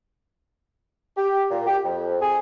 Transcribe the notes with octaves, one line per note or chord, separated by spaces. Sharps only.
G4
A#2
G4
F2
G#4